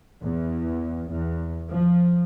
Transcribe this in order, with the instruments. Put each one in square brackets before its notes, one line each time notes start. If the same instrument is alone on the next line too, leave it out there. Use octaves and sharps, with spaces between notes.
[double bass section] E2
E2
F3